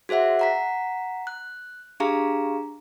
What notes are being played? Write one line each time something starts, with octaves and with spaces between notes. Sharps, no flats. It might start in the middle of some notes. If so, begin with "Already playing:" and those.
F#4 G#4 C5 E5 F#5
F#5 A#5 B6
F#6
D4 G4 G#4 F5 A#5